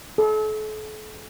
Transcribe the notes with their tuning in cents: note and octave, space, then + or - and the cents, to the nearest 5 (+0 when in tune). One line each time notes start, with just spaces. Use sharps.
A4 -40